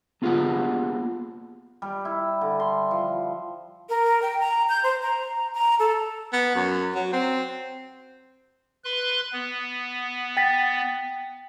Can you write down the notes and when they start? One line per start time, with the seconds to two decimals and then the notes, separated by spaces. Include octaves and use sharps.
0.22 A#3 B3 F4 G4 G#4 F#5
1.82 G3
2.05 E4
2.41 D3
2.60 C6
2.91 F3
3.89 A#4
4.22 G5
4.41 A#5
4.69 G6
4.84 C5
5.03 A#5
5.54 A#5
5.79 A4
6.33 B3
6.55 F#2
6.95 F#3
7.13 C4
8.85 B4 C6 F#6
9.33 B3
10.37 G5 A6 B6